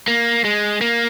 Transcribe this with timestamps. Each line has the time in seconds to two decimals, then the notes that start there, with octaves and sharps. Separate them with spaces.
0.08 A#3
0.44 G#3
0.81 A#3